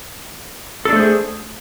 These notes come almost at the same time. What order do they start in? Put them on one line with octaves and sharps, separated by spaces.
A4 D4 A3 C5 G#4